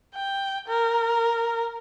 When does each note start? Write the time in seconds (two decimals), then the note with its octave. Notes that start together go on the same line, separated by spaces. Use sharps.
0.15 G5
0.68 A#4